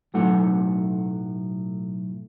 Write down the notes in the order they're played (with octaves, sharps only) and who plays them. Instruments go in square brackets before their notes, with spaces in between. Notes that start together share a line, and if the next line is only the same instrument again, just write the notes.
[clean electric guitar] B1 A2 F#3 A3 D#4 F#5